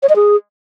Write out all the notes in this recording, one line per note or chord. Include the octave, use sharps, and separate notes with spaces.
C#5
D#5
G#4